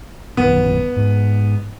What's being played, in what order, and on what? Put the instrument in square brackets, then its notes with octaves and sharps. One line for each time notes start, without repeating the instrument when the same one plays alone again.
[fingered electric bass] A#1 F#2 D#3 [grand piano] B3
[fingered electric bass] G#2